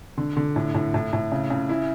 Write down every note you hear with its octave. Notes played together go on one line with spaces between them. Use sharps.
D3
D3
A2
A2
A2
A2
C#3
C#3
E4